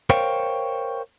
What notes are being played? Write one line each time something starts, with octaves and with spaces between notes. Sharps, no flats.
A#4 C5 C#5 F5 G5